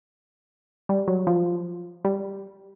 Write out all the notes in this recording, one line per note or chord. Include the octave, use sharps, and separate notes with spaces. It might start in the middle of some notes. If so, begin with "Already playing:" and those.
G3
F#3
F3
G3